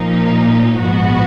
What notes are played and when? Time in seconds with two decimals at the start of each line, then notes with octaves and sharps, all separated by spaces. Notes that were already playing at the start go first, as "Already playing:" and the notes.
Already playing: A#2 F3 A#3 D#4
0.80 A#1 G#2 F3 B3 F#4